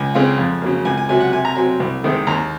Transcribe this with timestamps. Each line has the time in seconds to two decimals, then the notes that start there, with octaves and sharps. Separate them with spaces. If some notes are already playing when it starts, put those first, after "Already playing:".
Already playing: C#2 G#5
0.15 C#3 G#3 C4 F4
0.38 F2
0.62 C#3 F#3 A#3
0.85 C#2 G#5
0.98 G#5
1.09 C3 F#3 G#5
1.20 F#5
1.32 C3 G#5
1.45 A#5
1.56 F#3 C4 G#5
1.80 C2
2.04 C3 D#3 G#3 C4
2.27 D#2 A#5